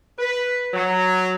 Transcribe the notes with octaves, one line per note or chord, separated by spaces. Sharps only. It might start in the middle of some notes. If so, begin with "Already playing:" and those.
B4
F#3